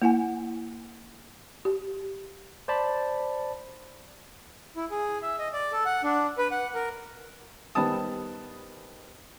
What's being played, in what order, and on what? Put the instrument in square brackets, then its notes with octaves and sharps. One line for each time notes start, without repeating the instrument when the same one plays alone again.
[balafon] A#3 E4 F#5 G#5
G4
[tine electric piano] C5 D5 A5 B5
[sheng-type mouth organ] E4
G#4
E5
D#5
D5
A4
F#5
D4
B4
F#5
A#4
[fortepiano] D#3 G3 B3 C5 A5 D#6